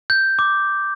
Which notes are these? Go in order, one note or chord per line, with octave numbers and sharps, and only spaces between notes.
G6
D6